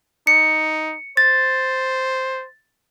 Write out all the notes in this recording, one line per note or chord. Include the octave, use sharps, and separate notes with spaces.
D#4 C#7
C5 A6